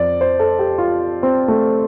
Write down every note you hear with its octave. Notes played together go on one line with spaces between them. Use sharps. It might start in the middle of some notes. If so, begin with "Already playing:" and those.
Already playing: F2 F3 D5
C5
A4
G4
F4
C4
A3